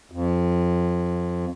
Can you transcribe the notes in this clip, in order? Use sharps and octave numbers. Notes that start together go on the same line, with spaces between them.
F2